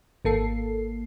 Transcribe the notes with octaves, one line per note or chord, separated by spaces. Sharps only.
G#1 A#3 A4 C7